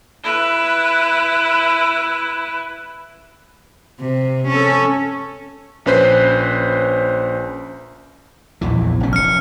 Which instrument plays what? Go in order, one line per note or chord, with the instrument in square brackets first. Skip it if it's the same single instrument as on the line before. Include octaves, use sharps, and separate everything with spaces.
[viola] E4 B4
[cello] C3
C#4 A4
[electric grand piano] A#1 C#4 B4 C5 B6 C7
[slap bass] A#1 E2 E3
F1 C#4
[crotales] F6 C#7